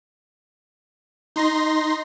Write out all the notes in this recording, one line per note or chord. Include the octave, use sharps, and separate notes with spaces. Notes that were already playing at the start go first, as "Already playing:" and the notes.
D#4 C6 A#6